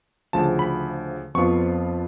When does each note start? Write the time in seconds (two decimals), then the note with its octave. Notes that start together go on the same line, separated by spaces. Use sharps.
0.33 D2 C#3 F3 A5
0.59 B5
1.34 F2 F3 B3 F4 C#6